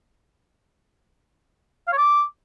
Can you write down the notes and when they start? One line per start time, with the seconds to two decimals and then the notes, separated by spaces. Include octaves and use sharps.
1.88 F5
1.93 C#5
1.98 D6